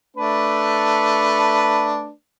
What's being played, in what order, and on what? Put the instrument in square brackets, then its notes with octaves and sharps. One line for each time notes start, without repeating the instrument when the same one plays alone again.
[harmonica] A3 D4 B4